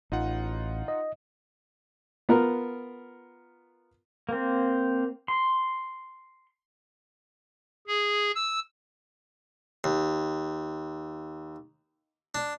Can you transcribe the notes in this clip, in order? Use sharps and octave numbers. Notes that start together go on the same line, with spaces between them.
A1 D#4 F4 F#5
D#5
B3 F4 A#4
A#3 C4
C6
G#4
E6
D#2
D4